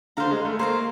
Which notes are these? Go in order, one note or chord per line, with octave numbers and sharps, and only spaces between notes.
D3 C5 F5 A#5
G#3
A3
A#3 C5 F5 A#5